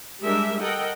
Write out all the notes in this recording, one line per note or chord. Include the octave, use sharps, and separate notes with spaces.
G3 G#3 D4 G4 A#4 E5
A4 A#4 D#5 F#5 G5